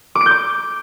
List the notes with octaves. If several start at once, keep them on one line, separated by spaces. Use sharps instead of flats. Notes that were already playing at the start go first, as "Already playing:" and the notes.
D6
D7
G6
D6